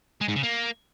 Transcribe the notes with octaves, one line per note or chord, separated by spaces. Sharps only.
G#3
G#2
C#3
A#3